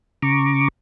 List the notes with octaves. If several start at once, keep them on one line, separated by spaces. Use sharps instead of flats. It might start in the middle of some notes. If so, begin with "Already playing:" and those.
C#3 A#5 C#6 D6